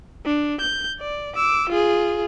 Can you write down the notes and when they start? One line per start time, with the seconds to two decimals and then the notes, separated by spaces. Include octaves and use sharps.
0.25 D4
0.61 G6
0.99 D5
1.36 D6 E6
1.69 F4 G#4